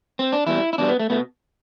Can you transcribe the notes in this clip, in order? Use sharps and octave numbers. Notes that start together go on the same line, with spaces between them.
C4
D4
E2 B2 G3 E4
E4
E2 B2 G3 D4
B3
A3
B2 A3 B3